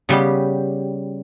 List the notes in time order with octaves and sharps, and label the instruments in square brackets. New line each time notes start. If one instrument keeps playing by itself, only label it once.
[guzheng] C#3 G3 B3 G4